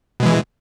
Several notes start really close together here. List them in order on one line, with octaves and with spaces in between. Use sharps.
B2 G#3 E3